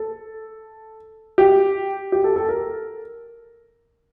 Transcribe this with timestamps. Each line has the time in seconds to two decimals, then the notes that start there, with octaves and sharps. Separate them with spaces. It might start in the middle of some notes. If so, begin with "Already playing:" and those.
Already playing: A4
1.38 G4
2.12 G4
2.24 A4
2.36 A4
2.49 A#4